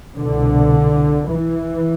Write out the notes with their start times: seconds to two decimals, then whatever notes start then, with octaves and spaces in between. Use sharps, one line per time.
0.16 C2 B2 D3
1.30 E3